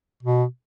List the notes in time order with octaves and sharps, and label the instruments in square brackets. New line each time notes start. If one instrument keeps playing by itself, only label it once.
[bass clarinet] B2